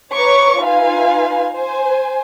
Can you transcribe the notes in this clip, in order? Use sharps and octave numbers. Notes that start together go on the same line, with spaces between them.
B4 C#5 A#5 C#6 D6
D#4 F4 B4 F5 G#5
C5 G#5